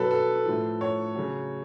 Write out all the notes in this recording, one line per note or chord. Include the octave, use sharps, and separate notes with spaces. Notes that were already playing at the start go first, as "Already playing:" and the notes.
Already playing: B2 F#3 A4 B4
A4
A2 F3
C#5
C#3 F#3